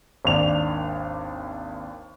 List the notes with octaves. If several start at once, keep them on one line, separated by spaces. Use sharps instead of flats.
G#1 D#2 D4 F7